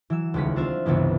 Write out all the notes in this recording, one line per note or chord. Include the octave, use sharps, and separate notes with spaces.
E3 F#3 E6
D#1 C#2 G#3 C#4 B6
C4 D4 F4 E5 F5 C6
G1 C#2 C3 E3 B3